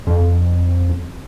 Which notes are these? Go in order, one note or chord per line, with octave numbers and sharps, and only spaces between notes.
F2